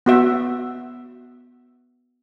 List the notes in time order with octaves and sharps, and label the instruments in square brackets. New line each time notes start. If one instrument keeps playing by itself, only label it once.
[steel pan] B3 F#4 E5